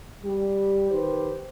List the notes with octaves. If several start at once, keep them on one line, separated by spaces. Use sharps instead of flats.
G3 G4
D#3 G4 B4 C5